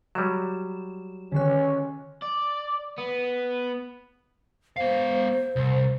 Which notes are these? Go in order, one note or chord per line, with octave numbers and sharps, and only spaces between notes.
F#3 G3 E7
D3 D#3 C#4 F#6
D5
B3
B3 C5 F5
C2